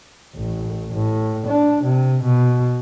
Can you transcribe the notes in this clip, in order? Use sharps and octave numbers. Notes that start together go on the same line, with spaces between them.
A1
A2
D4
C3
B2